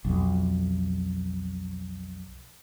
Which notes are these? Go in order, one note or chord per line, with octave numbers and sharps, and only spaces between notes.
B1 F2